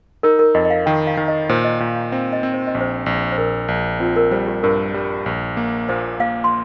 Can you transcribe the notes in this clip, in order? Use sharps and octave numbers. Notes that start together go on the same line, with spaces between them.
D#4 A#4
A#4
F2 D#5
D#5
F5
D#3 G5
F5
D#3
D#5
A#2 C5
D#5
A#2 F5
F5
C4 F5
D#5
C4
C5
D#5
A#1
C5
A#1
C5
A#1 A#4
A#1
C4 F4
A#4
G3 C5
G4
G2 A#4
G3
A#1
A#3
A#2 C5
A#3 F5
C6